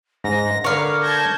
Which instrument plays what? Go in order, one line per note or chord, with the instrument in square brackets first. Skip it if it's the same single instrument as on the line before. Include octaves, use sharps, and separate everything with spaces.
[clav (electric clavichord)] G#2 [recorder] A#6
[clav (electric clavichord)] D3 A#4 B4 [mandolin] C#5 F5 [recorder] D6
[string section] A5 G6 G#6 [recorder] A#6